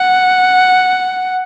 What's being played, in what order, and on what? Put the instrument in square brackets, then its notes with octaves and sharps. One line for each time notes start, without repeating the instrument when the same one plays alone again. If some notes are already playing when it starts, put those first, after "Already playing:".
Already playing: [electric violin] F#5